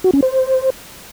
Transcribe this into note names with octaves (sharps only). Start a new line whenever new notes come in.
F#4
C#4
C5